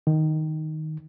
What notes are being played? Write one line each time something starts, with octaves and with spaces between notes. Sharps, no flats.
D#3